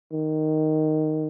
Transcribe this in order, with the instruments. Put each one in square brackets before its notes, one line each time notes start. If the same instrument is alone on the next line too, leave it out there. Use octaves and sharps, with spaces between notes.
[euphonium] D#3